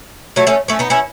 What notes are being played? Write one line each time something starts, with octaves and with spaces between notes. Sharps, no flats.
F#3 A3
A3 C#4
A3 C#4
B3 D#4
C#4 E4